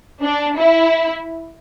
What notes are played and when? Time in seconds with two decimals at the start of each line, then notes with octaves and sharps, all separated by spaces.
0.23 D4
0.59 E4